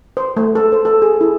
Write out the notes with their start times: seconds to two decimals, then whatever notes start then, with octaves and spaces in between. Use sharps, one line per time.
0.17 C5
0.37 A3
0.55 A4
0.72 C5
0.85 A4
1.02 G#4
1.21 E4